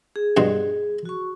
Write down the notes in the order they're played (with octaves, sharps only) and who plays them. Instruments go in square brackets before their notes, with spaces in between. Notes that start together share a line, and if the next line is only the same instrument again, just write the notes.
[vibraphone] G#4
[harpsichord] G2 B2 C6
[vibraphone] F#4 C#6